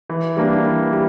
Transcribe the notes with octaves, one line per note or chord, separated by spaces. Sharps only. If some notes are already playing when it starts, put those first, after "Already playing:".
E3
G3 A#3 D4
E3
G3